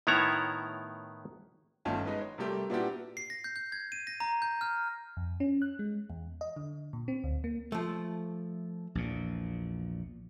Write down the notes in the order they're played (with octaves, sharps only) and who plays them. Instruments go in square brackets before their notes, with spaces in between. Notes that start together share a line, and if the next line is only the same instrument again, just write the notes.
[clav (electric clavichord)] A2 D#3 B3 E4 C#5 A#5
[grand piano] G1 D#3 A3 C#4 F4 A5
G#3 D#4 B4
C#5
C3 G3 A3 G4 A#4
A#2 B3 D4 E4 F#4 G4
[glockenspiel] C7
A#6
G6
G6
G#6
D#7
A#6
A#5
G6
F6
[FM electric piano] F2
C#4
F#6
G#3
E2
D#5
D3
A#2
C4
D2
A#3
[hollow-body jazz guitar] F3 A3
[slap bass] A#1 E2 A#2